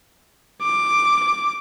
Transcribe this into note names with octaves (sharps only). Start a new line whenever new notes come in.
D6